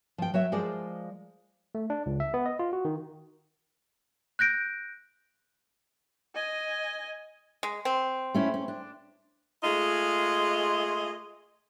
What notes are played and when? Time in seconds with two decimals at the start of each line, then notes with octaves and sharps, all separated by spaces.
0.18 F3 G5
0.34 F#3 C#5 E5
0.52 F3 G#3 A#4 C5 D5
1.75 A3
1.90 D4
2.06 C#2
2.20 E5
2.34 B3
2.46 D#5
2.59 F4
2.73 F#4
2.85 D#3
4.39 F#6 G6 A#6 D7
6.35 D#5 G#5
7.63 G#3
7.85 C4
8.34 A3 C#4 E4
8.54 C#4
8.68 D4
9.64 G#3 A3 F4 G#4 D#5